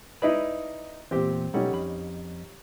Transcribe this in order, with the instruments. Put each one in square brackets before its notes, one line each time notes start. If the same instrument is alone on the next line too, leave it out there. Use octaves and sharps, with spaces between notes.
[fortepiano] D#4 E4 D#5 [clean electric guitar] B4 D5 B5
[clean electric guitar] E2 A#2 [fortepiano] C4 G4
[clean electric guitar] B1 A4 F#5 [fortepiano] G3 C#4 D#4
[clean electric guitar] F2 B5